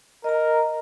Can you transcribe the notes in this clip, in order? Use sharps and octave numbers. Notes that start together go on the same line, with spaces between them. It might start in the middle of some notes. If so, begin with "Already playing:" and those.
A#4 D#5 A#5